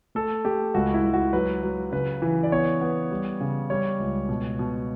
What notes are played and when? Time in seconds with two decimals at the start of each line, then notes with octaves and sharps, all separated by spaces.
0.15 A3 A4
0.45 A3 G4
0.74 C#2 F#4
0.94 E4
1.04 C#2
1.13 F#4
1.33 F#3 B4
1.63 F#3
1.92 C#3 B4
2.22 E3
2.43 D5
2.52 B3 C#5
2.81 B3
3.11 G3
3.41 C#3
3.70 G3 C#5
4.00 C#2
4.29 B2
4.59 B2